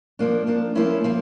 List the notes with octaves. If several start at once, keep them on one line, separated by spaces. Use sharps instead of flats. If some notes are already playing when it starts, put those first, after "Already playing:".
F3 A#3 D4
F3 A#3 D4
F3 A#3 C#4 E4
F3 A#3